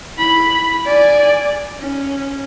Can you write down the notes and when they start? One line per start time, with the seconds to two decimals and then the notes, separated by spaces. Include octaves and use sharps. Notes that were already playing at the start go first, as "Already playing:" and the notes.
0.18 E4 B5
0.86 D5 G#5
1.80 C#4